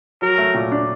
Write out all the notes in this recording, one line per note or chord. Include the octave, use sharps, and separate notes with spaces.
F#3 A#4
A3
A#2
D4